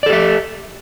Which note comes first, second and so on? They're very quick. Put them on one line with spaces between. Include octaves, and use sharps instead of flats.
D5 A4 G4 E5